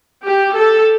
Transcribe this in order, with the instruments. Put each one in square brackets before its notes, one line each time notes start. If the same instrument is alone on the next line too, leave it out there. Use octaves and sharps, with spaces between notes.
[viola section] G4
A4